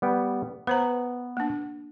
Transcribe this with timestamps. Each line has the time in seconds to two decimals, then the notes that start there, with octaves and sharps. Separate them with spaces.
0.02 G3 B3 G5
0.67 B3 B4 C5 A#5
1.37 A#3 D4